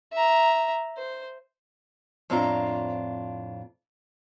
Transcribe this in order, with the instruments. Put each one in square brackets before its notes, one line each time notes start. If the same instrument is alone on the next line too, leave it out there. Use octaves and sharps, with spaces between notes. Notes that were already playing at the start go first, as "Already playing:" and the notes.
[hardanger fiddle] E5 A#5
C5
[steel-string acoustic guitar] F2 A2 C4 D4 F4 A#5